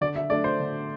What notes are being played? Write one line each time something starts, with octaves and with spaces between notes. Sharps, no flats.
D3 D5
E5
A3 D4 D5
C5
D3